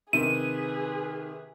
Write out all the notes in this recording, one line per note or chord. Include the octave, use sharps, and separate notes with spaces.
C3 D#3 G#4 B4 D#7